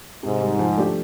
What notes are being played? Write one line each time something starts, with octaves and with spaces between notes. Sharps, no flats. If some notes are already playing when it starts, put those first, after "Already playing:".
G#2 C3
D#3 G3
F3
A3 D4 G4